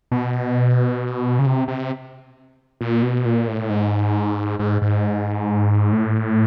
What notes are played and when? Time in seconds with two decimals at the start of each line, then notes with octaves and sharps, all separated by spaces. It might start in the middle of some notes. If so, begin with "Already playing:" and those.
0.11 B2
1.39 C#3
1.46 C3
1.68 C3
2.81 A#2
3.03 B2
3.25 A#2
3.48 A2
3.70 G#2
4.59 G#2
4.82 G#2
5.92 A2